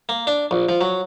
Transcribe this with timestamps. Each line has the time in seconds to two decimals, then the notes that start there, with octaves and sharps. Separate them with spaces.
0.09 A#3
0.27 D4
0.51 A#1
0.69 F3
0.81 F#3